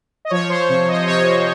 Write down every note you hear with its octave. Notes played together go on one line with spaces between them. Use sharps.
D#5
F3 C#5
C5
C3 C#5
D#5
C3 C#5